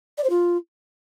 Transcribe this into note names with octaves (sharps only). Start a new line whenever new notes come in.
D5
C5
F4